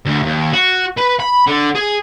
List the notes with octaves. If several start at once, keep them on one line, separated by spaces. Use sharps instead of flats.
D2
D#2
F#4
B4
B5
D3
G#4